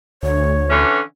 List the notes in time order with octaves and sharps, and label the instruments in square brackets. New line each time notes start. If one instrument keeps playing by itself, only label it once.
[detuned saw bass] D2 [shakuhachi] C#5
[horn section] D3 E3 C#4